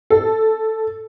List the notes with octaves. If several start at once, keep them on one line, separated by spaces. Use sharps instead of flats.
A4